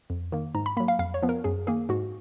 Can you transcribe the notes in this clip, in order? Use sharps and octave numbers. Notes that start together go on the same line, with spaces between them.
F2
D#3 A#3
G#2 A#5
B5
F#3 A#3 B5
F5
F2 F5
C#5
F3 B3
A#4
F#2 G#4
D#3 A#3 G#4
G#2 F#4